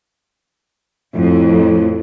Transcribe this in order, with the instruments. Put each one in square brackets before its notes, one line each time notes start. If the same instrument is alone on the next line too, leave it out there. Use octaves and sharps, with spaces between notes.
[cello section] F2 [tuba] A2